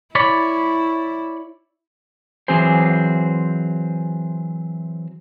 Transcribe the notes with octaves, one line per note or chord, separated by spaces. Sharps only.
E4 C#5 D5 B5
E3 F#3 C4 G#4 C5